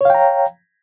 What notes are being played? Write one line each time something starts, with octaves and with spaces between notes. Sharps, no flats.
C#5 F5 G5 A#5